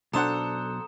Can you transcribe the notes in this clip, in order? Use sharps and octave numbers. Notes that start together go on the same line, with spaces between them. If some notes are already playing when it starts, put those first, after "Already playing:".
B1 D4 A4 C5 F#5 A#5 D#6 E7